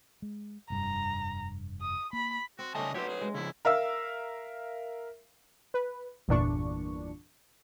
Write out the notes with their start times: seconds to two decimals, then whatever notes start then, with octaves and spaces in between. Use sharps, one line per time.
0.22 G#3
0.70 F1 G2 A#5
1.81 D#6
2.13 A#3 B5
2.59 C4 F#4
2.75 C#3 A3 C#4 D4 D#5 G#5 A5
2.94 F#3 C4 G4 B4 C#5
3.09 G#4
3.21 G#3
3.35 C#3 F3 E4
3.65 A#4 E5 F5 E6
5.74 B4
6.28 G1 E2 A#2 D4 C#6